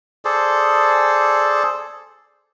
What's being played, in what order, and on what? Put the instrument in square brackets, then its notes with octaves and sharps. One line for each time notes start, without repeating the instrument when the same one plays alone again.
[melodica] G#4 A4 C5 D5